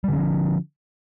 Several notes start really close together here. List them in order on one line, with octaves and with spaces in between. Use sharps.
G3 D3 C#4 F3